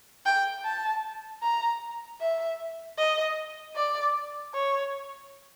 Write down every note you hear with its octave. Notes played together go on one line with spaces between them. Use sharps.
G5
A5
A#5
E5
D#5
D5
C#5